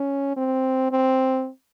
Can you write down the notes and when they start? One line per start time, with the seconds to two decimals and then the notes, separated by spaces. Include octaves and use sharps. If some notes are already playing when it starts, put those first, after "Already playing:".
Already playing: C#4
0.37 C4
0.92 C4